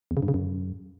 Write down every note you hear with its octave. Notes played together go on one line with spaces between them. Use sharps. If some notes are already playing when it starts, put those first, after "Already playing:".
E2
C#3
G2
C#3
F#2